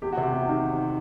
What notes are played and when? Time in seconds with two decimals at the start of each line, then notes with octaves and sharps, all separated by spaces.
0.02 E2 G4
0.12 F#4
0.17 C3
0.23 G4
0.32 E2
0.49 D#3